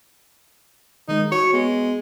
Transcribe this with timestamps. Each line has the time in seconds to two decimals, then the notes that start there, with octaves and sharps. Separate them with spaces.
1.08 D#3 G#3 D#4
1.32 F#4 C#5
1.53 G#3 B3